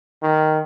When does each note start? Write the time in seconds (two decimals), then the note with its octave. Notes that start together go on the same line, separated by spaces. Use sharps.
0.22 D#3